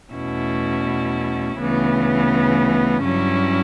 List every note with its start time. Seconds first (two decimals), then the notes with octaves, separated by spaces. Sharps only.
0.12 E2 B2 A3 C#4 E4
1.58 D2 C#3 E3 B3
3.05 G2 F#3 C#4 E4